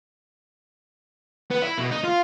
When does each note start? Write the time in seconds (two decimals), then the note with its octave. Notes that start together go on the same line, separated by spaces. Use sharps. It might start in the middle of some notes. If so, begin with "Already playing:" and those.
1.51 B3
1.62 E4
1.78 B2
1.91 D#4
2.04 F4